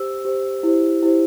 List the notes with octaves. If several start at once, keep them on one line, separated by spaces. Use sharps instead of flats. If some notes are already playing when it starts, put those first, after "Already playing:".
Already playing: G4 C5 E6
G4 C5
E4 G4 C5
E4 G4 C5